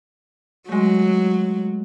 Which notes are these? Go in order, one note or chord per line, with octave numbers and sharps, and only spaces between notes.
F#3 G#3 A3